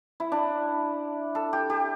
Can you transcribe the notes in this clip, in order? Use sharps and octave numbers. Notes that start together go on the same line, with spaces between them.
E4
D4
A4
G4
G4